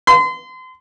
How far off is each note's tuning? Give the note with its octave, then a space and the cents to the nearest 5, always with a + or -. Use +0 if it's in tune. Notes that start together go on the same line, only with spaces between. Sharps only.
C6 -35